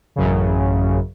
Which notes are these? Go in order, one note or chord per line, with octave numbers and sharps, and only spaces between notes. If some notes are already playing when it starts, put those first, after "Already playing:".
A1 F#2 C#3